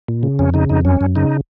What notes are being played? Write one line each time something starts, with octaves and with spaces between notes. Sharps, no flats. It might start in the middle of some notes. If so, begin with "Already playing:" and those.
A#2
C#3
F2 C#4
C#3 D#4
F2 D#4
F#2 C#4
F#2
C#3 D#4